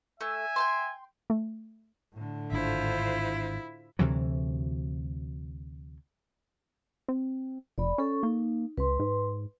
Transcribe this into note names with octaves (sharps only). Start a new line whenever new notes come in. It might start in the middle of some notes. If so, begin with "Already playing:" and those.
A3 E5 G#5 E6
G5 A5 C6
A3
A2 D3
G#1 D4 E4 F4 C5
D2 C3 E3 F#3
C4
F1 D5 B5
C#4 A4 C#6
A#3 D#4
C#2 B4 C6
G#2